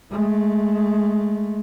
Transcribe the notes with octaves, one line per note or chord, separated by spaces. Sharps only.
G#3 A3